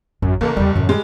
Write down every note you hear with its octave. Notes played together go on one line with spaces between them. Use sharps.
A1 F#2
F#1 E3 A#3 A4 A#4
E2 G3 E4
F#2 A2 D#3
G3 G#3